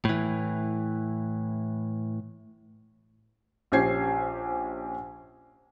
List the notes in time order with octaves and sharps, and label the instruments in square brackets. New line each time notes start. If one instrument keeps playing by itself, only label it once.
[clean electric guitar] A2 E3
[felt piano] A#1 C#4 G4 C5 G#6 C7